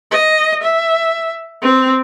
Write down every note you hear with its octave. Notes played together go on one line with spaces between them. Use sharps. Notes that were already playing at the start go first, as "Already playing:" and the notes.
D#5
E5
C4